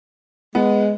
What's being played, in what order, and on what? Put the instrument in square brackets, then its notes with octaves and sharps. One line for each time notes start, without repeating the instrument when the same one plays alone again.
[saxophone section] G#3 [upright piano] B3